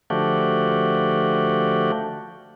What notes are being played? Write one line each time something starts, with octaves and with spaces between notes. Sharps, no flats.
D3 F3 A3 F#4 G4